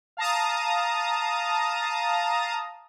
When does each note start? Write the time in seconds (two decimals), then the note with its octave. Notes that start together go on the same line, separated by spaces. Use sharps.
0.17 F5 A5 A#5 D#6